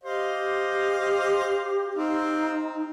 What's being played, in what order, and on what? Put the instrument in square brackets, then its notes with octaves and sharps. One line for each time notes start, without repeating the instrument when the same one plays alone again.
[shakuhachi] G4 [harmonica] C5 D#5 F5
[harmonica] C4 F5 [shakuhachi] D#4